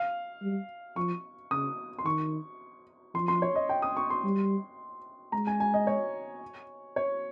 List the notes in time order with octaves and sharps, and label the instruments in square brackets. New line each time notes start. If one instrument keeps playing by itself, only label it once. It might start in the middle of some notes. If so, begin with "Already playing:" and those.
Already playing: [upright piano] F5
[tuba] G3
[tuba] F3 [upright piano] C#6
[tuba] C#3 [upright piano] D#6
[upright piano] C6
[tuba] D#3 [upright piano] C#6
[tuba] F3 [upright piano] C6
[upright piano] C6
C#5
D#5
G5
D#6
C#6
C6
[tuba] G3
[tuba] G#3 [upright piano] A#5
[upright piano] G#5
G#5
D#5
C#5
C#5